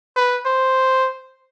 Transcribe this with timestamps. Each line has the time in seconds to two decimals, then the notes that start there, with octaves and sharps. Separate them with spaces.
0.16 B4
0.46 C5